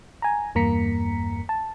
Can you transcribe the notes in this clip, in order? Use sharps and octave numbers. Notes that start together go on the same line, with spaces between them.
G#5 A#5
E2 G2 A#3 A#5 B6 C#7
A5